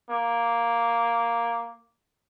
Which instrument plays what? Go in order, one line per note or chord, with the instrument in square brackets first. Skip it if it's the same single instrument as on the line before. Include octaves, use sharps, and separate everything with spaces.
[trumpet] A#3